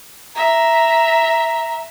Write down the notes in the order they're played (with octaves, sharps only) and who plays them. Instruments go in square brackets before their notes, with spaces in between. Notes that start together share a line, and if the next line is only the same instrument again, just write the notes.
[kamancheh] E5 [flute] A#5